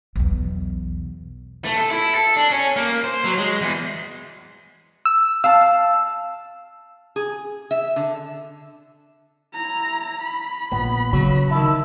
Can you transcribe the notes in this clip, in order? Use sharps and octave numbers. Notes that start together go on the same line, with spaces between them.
B1 E2
A3
A4
E4
A4
D4
C#4
A#3
C5
F#3
G#3
E2
E6
F5 A5 E6
G#4
E5
D3
E4 A#5
B5
A#1 B3
C#3 F#3
D#3 E4 A5